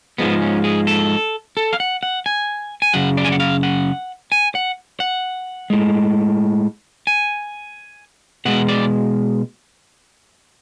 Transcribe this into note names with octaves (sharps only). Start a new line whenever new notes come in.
G#2 F3 G#3 B3
C#4
G#4
A4
A4
F5
F#5
F#5
G#5
G#5
F#2 C#3 F#5
D5
G#5
F#5
F5
F#5
G#5
F#5
F#5
A2 G#3
G#5
B2 G#3 F#5
D5